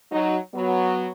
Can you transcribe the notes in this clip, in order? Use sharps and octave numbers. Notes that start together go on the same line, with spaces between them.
F#3 D#4
F#3 B3